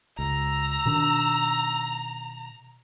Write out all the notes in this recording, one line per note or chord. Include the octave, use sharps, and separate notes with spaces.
C#2 A#5 E6
B2 D#3 D4